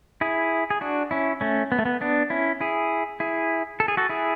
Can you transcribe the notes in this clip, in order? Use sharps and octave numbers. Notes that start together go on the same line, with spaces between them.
E4 G#4
G#4
D4 F#4
C#4 E4
A3 C#4
B3
A3
B3
B3 D4
C#4 E4
E4 G#4
E4 G#4
A4
G#4
F#4 A4
E4 G#4